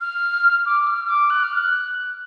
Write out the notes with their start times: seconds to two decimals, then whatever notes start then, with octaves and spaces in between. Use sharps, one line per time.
0.01 F6
0.66 D6
0.87 F6
1.09 D6
1.30 F#6
1.43 F6
1.57 F#6